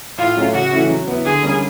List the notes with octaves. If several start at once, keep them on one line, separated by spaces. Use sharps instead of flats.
A2 F4
F#3 A3 C#4
C#3 F#4
E3 A3 C#4 E4
F#3
B3 E4
D3 G#4
G3 A#3 C#4